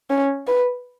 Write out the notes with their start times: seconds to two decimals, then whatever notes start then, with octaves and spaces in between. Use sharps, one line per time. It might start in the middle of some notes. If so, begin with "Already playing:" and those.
0.10 C#4
0.47 B4